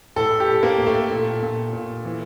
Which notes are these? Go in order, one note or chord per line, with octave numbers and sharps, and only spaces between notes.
A2 A4
G4
A2
A#3
A2
A3
A#2
A#2
A#2
E3